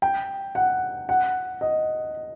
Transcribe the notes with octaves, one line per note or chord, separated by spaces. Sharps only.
G5
F#5
F#5
D#5